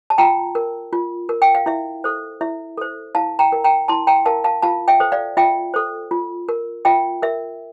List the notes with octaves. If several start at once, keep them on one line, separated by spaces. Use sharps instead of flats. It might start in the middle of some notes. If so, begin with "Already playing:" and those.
A5
F4 G5 A#5
A#4
F4
A#4
G5
F5
E4 E5
A4 C5
E4 E5
A4 C5
E4 F5 A5
G5 A#5
A#4
G5 A#5
E4 A5 C6
G5 A#5
A#4 F5 A5
F5 A5
F4 F5 A5
E5 G5
A4 C5
D5 F5
F4 E5 G5
A4 C5
F4
A#4
F4 E5 G5
A#4 E5